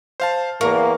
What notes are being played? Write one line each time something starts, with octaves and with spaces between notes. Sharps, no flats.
C5 F5 A5
E2 A#3 A#4 F5 C#6